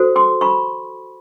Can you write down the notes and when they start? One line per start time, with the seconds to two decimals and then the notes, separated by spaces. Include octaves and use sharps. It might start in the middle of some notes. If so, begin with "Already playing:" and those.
Already playing: F#4 A4 C5
0.16 C6 D6
0.41 B5 C#6